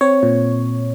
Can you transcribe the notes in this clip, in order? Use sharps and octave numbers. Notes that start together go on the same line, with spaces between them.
C4 C#5
A#2